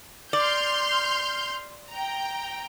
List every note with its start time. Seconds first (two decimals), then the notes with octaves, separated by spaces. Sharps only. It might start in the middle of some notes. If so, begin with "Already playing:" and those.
0.33 D5 C6 F6 G6
1.90 G5 A#5